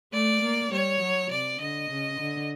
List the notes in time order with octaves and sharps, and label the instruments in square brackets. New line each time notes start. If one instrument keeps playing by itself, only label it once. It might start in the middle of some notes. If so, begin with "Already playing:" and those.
[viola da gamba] A3 [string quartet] D5
[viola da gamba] A#3
[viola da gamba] G3 [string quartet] C#5
[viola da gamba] F#3
[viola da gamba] C3 [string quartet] D5
[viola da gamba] D3 [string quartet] D#5
[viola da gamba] C#3
D3